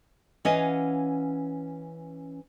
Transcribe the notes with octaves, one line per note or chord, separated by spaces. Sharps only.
E3 C#4 C#5 D#5 F5 F#5